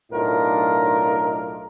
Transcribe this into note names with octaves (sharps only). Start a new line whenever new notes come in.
B1 A2 D4 D#4 F4 A#4